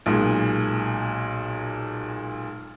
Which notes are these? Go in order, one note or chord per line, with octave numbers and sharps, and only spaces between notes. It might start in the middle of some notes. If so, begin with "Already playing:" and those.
B1 A#2 G#3